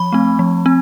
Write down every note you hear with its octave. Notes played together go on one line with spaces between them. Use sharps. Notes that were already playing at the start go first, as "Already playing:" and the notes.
Already playing: F3 B5
A3 C4
F3
C4